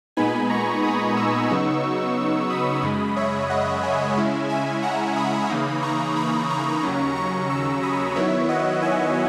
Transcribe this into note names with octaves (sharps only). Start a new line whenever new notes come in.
A#2 G#3 B3 D#4 G#5 B5
A#5 C#6
B5 D#6
C#6 E6
C#3 F#3 B3 D#4
B5 D#6
F#2 C#3 G#3
C#5 E5
D#5 F#5
E5 G#5
C#3 G#3 C#4 E4
E5 G#5
F#5 A#5
B5 D#6
C#3 E3 A#3 D#4
A#5 C#6
B5 D#6
A#5 C#6
D#2 C#3 F#3 C#4
A#5 C#6
C#6 E6
B5 D#6
D#3 F#3 B3 E4 C#5 E5
D#5 F#5
E5 G#5